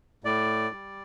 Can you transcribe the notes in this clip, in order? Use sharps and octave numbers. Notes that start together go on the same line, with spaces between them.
A2 D5
G3